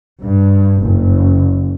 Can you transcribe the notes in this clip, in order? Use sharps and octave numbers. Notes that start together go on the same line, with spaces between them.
G2
F#1